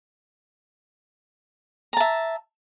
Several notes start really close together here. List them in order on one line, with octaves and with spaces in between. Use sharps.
A#5 A5 E5